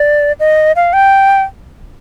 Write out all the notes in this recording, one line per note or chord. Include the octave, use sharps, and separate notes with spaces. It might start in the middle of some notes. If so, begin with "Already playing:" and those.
Already playing: D5
D#5
F5
G5